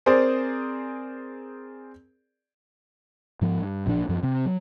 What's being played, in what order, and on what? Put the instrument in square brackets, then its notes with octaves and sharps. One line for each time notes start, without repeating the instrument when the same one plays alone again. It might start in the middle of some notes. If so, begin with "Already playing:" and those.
[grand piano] C4 G#4 A#4 C5 D5
[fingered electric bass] G#2 F3
G2
A1 A#2 F3 D4
F#2 F3
C3 C4
F#3